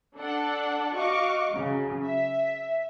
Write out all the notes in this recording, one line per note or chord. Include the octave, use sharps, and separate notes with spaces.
D4 A4 D5 F#5
F#4 D#5 F5 C#6 D6
C#3 F#3
E5